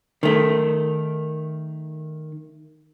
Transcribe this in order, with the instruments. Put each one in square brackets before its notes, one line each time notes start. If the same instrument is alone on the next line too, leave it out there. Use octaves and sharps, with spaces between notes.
[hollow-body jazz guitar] D#3 A3